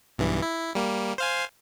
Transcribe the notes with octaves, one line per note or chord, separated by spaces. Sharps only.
B1 G2 E3
E4
G3 A#3
C5 F5 G#5